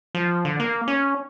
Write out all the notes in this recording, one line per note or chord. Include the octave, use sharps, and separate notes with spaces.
F3
D3
A#3
C#4